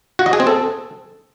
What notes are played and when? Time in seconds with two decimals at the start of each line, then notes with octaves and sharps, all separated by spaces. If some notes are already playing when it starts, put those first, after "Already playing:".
0.19 F#4
0.26 D#5
0.33 G#4
0.40 C4
0.47 A4